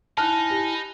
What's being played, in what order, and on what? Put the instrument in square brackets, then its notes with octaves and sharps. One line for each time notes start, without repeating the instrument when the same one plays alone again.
[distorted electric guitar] D#4 [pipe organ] E4 G#5 [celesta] A5 [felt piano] F6 F#6
[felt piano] G4